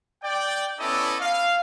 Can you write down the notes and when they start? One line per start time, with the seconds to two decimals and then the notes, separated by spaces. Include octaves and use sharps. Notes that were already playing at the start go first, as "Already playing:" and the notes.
0.23 D5 G5
0.79 B3 C#4 E4 A4 D5 D#5
1.20 F5